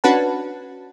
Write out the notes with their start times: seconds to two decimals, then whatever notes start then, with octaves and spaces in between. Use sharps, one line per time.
0.04 C#4 D4 F#4 B4 F#5 A5